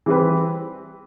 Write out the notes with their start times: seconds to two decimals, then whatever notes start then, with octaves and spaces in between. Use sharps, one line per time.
0.06 E3 G3 C4 G4 B4